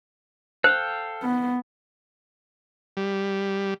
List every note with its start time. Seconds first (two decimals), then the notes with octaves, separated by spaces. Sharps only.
0.64 A4 C5 F5 G5
1.23 B3
2.97 G3